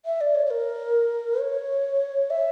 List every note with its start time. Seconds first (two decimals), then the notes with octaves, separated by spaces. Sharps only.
0.06 E5
0.21 D5
0.35 C#5
0.46 C#5
0.51 A#4
1.40 C#5
2.31 E5